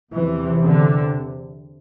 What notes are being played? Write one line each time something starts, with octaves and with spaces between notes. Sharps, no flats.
E2 C3 E3
D3